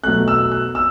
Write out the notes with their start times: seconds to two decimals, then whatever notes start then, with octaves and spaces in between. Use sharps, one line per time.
0.04 B2 F#3 A3 F#6
0.28 E6
0.52 F#6
0.75 E6